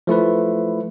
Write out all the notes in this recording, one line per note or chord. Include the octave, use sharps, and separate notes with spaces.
F3 A3 E4 B4